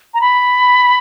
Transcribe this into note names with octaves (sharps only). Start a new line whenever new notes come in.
A#5
B5